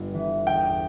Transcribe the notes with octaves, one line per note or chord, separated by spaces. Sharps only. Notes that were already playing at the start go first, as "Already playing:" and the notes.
Already playing: G1 G2 G3
E3
E2 G5